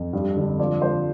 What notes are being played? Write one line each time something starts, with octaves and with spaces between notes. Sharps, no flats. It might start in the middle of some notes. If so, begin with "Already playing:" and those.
Already playing: F2
G2
D3
F3 D5
F3 C5